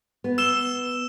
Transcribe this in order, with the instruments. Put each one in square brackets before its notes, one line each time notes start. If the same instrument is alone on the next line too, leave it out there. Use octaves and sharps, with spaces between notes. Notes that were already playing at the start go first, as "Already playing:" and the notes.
[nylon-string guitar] B3
[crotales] E6 E7 G7